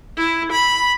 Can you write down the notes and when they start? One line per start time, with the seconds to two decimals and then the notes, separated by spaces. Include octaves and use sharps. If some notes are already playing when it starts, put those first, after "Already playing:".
0.18 E4
0.52 B5